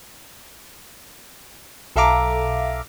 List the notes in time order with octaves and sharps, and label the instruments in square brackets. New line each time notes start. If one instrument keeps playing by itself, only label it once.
[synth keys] B1 A4 E5 F5 A#5 D6